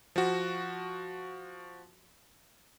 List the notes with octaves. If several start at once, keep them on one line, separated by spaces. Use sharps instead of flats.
F3 F#4